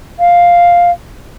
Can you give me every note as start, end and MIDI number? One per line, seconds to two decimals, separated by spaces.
0.19 0.91 77